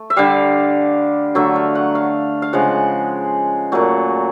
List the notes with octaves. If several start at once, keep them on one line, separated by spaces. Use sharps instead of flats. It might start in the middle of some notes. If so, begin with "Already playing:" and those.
Already playing: A3
E5
D3 G3 F5
D3 F#3 A3 E5
F5
F#5
F5
F5
C#3 F3 G#3 F#5
A#2 F#3 A3